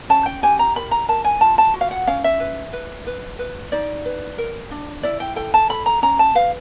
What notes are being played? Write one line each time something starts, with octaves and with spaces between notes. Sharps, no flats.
C#4 A5
G5
G4 G#5
A#5
A#4 B5
A#5
A#4 A5
G#5
F4 A5
A5
F#4
F5
F#5
C#4 F5
E5
B4
B4
B4
B4
D#4 D5
B4
A#4
D4
E4 D5
G5
A4 G5
A5
A4 B5
A#5
C#4 A#5
A5
B4 F5